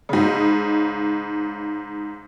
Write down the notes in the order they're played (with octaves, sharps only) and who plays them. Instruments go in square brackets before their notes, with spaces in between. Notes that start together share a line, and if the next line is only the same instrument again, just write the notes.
[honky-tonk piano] G#2 C#3